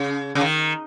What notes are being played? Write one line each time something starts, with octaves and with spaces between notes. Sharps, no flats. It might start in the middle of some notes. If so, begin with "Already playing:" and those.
Already playing: C#3
C#3
D#3